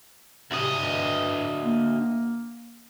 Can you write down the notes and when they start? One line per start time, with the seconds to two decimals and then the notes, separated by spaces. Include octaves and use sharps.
0.51 D2 C3 D#5
0.74 G2
1.64 A#3